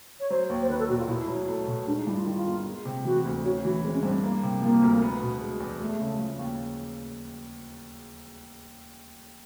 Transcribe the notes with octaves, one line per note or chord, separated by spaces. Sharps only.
C#5
F#3 C5
D#2
C5
D#3 B4
A4
E1 F#4
F4
B2 E4
F#3
A3
B2
G#3 D4
D#4
G2 E4
F4
D#3 E4
F4
G1
G#3
C3
E3 F#4
D2
C#4 F#4
E3 F#4
G#3 C4
C#4
G2 C4
A#3
C3
F3 A#3
D2
B3
B2
G#3
E2
G#3 A3
C#3
F3
D#2